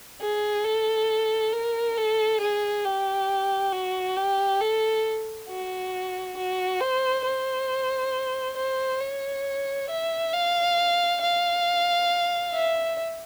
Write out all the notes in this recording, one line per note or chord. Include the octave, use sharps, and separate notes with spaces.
G#4
A4
A#4
A4
G#4
G4
F#4
G4
A4
F#4
F#4
C5
C5
C5
C#5
E5
F5
F5
E5